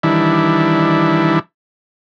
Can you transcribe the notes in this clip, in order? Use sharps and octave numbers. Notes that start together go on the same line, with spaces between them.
D#3 E3 G3 D4 E4